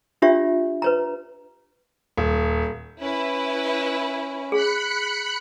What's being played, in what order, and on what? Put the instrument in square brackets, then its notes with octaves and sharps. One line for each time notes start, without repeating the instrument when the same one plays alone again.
[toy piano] D4 F4 G4 C#5 E5
B4 C#5 A#5
[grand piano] D#1
[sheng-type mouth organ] C#4 [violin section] E4 B4
[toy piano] G#4 [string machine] B5 F#6 C#7